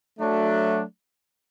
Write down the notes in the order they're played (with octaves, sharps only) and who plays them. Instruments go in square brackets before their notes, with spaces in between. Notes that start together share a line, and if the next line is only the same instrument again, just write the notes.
[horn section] F#3 A3 D4